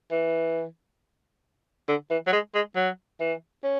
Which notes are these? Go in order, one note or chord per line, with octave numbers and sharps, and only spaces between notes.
E3
D3
E3
F#3
G#3
G#3
F#3
E3
C#4